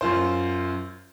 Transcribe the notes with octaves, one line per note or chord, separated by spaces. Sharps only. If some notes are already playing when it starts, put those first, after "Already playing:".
F#2 F4 C5